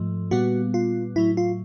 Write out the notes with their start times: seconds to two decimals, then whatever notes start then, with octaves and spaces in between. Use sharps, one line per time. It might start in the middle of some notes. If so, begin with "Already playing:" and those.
Already playing: G#2 F3 A3
0.31 A#2 G3 B3 F#4
0.74 F4
1.16 A2 F#3 A3 E4
1.37 F4